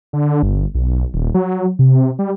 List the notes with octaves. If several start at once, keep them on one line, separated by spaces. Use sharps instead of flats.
D3
G1
B1
D#1
F#3
C3
G3